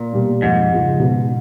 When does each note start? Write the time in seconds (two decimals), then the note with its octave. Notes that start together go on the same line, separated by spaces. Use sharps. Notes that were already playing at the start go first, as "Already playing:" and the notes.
Already playing: A#2
0.13 B2 G3 A#3
0.42 F2 G#2
0.72 C#3 F3 G#3
1.00 B2